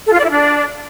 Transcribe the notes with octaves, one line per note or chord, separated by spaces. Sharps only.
A4
F4
D5
E4
D4